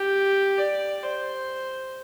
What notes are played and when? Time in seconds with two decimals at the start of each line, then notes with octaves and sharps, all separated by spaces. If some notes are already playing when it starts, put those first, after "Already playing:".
Already playing: G4
0.58 D5
1.03 C5